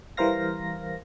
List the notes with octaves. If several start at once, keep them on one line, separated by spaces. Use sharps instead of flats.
E3 G3 A#4 C5 F5 A#6